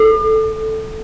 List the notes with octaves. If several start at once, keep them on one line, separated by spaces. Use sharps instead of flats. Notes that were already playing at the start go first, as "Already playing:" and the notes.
Already playing: A4